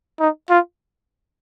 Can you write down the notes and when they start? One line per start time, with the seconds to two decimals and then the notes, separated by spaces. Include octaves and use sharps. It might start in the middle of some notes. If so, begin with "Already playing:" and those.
0.19 D#4
0.50 F4